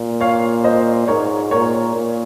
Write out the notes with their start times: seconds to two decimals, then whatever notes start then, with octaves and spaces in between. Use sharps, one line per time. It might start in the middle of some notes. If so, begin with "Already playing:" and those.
Already playing: A#2
0.21 C#5 F5
0.64 C5 D#5
1.08 G#2 A#4 C#5
1.51 A#2 A#4 C#5
1.95 A#2